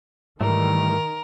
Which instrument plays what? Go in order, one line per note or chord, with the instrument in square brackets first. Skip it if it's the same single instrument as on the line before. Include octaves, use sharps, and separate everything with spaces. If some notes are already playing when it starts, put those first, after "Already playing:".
[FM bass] G#2 [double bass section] D#3 [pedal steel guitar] E3 G3 A3 [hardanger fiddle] A#4